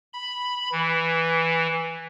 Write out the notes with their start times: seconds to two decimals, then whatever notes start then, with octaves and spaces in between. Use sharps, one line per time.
0.13 B5
0.72 E3